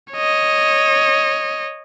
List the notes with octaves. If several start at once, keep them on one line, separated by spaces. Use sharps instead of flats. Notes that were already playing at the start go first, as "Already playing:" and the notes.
C#5 D#5